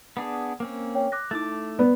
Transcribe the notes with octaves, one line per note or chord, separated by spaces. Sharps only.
B3 D4 G#4
A#3 C4 C#4
C#5 G5
D6 F#6 A#6
A3 D#4 E4 D6 A6
B3 D5